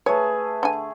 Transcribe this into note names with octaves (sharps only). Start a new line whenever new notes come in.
A3 G#4 B4 C#5
D3 G#5